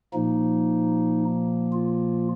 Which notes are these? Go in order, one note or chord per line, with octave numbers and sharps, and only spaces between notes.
A#2 F3 A#3 D#4
F4